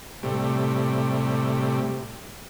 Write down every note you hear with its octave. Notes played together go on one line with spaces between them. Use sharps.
A2 C3 G3